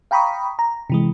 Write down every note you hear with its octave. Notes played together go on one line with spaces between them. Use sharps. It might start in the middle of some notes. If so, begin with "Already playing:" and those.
F5 G5 A#5 B5 C#6 D#6
A#5
C3 E3 G#3